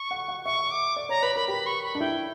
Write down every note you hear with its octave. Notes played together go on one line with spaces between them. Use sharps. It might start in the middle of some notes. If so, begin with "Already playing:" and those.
Already playing: C#6
F#5
F#5
E5 C#6
D6
D5
C#5 A#5
B4 B5
A#4 B5
G4 B5
C#6
B5
D4
E4 G5